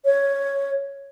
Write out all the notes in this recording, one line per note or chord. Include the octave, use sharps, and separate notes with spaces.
C#5